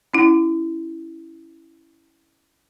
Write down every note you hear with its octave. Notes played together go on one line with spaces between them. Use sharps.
C#4 E4